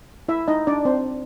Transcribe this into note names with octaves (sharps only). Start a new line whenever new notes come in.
E4 E5
D#4 D#5
D4 D5
C4 C5